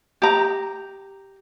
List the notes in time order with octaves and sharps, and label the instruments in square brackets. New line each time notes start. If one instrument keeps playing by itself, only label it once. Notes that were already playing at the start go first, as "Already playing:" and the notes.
[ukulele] G4 A#5